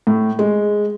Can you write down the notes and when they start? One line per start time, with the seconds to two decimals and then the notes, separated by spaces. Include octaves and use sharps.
0.07 A2
0.39 G#3